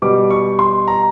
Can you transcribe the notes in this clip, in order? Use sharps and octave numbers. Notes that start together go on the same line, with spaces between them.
B2 G3 D6
C#6
C6
A#5